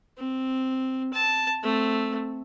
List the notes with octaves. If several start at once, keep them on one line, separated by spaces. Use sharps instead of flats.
C4
A5
A3 C4